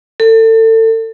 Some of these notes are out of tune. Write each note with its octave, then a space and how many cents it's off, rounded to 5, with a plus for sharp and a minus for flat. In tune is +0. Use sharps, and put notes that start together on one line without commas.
A4 +30